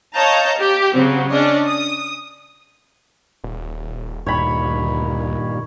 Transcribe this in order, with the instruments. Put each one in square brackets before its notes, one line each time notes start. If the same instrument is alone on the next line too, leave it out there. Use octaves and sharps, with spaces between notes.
[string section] C#5 D#5 F5 A5 A#5 G6
G4
C#3 F#3 C4
C#4 D4 D5 D#5
D#6
[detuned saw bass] D#1
[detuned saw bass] D2 [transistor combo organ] G2 A#2 D#3 [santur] C#5 B5